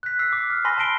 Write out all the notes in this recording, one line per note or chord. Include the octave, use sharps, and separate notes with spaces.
F#6 B6
E6 B6 C7
D6
F6
G#5 B5 C6 A#6 B6
A5 B5 C7 D7 G7